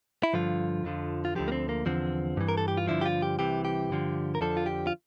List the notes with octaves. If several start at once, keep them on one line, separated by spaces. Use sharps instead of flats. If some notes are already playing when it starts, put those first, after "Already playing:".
E4
G2 D3 F3 F4
F2 D3 F3
F4
D2 D3 F3 G4
A#3
C4
A#3
E2 D3 F3 C4
G2 E3
A#4
A4
G4
F4
G2 D3 F3 E4
G4
F4
G4
C2 C3 E3 G4
G4
G2 D3 F3
A#4
F2 D3 F3 A4
F4
G4
F4